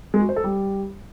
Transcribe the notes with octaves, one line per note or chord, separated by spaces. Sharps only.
G#3
F#4
C5
A4
G3